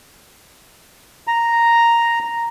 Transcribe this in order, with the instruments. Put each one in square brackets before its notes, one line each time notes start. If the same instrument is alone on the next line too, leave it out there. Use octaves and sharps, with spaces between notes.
[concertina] A#5